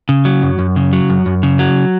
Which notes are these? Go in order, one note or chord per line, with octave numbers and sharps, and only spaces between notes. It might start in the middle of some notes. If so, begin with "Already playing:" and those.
C#3
F#3
F#2
F#2
C#3
F#3
F#2
F#2
C#3
F#3